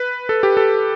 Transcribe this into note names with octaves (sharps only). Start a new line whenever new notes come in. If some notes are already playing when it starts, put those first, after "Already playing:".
Already playing: B4
A4
G4
A4